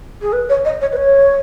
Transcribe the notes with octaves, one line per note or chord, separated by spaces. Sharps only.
G#4
B4
C#5
D#5
C#5
B4
C#5